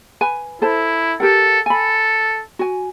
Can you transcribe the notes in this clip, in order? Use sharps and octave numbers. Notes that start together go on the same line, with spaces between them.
B4 G#5
E4 A4 C5 A5
G4 A4 A#4 F#5
A4 G#5 B5
F#4 G#5